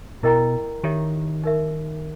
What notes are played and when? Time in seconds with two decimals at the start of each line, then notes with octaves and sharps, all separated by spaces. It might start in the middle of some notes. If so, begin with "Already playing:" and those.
0.23 B2 E4 A#4 D#5 G5 A#5
0.84 D#3 G4 C#5 E5
1.44 D#4 A#4 E5